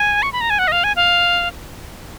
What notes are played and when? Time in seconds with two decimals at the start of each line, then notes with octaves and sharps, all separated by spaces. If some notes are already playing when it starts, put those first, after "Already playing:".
Already playing: G#5
0.23 C#6
0.33 B5
0.41 A#5
0.50 G#5
0.59 F#5
0.68 D#5
0.72 F5
0.84 G#5
0.96 F5